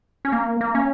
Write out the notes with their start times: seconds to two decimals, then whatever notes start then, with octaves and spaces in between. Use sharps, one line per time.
0.25 C#4
0.32 A#3
0.61 A#3
0.75 C#4